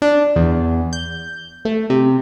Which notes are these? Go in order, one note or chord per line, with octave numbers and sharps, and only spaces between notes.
D4
E2
G6
A3
C3